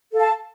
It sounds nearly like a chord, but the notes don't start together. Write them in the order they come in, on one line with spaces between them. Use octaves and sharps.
A4 F5 A5